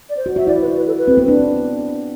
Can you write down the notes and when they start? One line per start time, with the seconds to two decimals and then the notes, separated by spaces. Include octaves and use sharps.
0.10 D5
0.17 C5
0.26 F#4
0.36 F#4 E5
0.47 E4 D5
0.61 B4
0.76 B4
0.87 A4
0.98 B4
1.08 C4
1.18 B3
1.28 D4